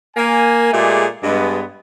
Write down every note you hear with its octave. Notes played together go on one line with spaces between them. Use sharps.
A#3 G#5
A#2 G#3 A3 G4 G#4 D5
G2 G#3 B3